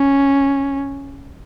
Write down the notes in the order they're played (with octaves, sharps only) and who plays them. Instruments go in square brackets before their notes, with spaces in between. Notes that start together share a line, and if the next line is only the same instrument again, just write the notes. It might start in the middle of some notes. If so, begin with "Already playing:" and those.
Already playing: [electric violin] C#4